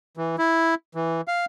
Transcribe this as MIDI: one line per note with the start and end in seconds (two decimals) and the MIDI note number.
0.17 0.36 52
0.38 0.75 64
0.95 1.21 52
1.28 1.46 77